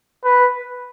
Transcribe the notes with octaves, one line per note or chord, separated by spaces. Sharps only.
B4